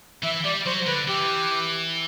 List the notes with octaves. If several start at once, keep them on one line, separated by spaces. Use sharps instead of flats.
E3 E5
G3 D5
F#3 C5
D3 B4
E3 G4